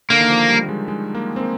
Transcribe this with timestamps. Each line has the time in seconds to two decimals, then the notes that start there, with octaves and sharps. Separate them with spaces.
0.10 D3 A#3
0.21 D#3
0.30 F3
0.49 G3
0.69 G#3
0.88 G#3
1.15 A#3
1.36 C4
1.40 A#3